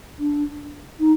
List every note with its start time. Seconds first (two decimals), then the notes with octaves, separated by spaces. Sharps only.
0.19 D4
1.00 D#4